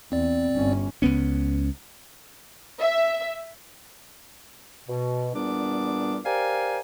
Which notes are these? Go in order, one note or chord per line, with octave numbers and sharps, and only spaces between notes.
E2 C4 D5
G1 C#4
C#2 B3 C#4
E5
B2
E2 A#2 G3 B3 D4 D6
G4 A#4 C5 D5 F5 G#5